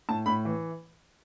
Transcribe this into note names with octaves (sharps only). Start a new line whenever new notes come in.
A2 A5
A2 B5
E3